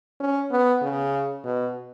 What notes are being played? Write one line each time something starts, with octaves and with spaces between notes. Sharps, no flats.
C#4
B3
C#3
B2